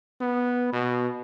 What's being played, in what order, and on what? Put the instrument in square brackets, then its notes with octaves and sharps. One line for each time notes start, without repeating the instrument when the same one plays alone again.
[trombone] B3
B2